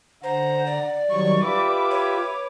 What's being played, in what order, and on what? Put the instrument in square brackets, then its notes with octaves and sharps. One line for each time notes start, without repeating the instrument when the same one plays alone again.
[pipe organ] D3 A#5 [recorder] C5 [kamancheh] F#5
[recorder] D5
[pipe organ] D#3 F#3 G3 [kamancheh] C#5 C#6
[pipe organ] F4 G4 E5 [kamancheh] B4 D6
[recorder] C#5